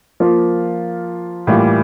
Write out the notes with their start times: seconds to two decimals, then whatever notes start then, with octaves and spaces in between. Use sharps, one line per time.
0.20 F3 A#3 F4
1.47 A2 E3 G3 A#3 F4